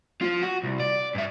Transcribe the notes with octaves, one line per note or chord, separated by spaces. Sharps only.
F3 F4
F#4
C2
D5
G2 E5